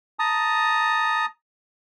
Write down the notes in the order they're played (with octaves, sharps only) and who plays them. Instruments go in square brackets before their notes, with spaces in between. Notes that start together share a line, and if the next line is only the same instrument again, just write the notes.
[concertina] A5 A#5 D#6